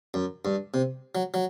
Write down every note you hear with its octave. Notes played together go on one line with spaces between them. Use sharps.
F#2
G2
C3
F#3
F#3